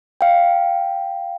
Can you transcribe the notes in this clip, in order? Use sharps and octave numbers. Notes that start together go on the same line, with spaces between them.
F5 G5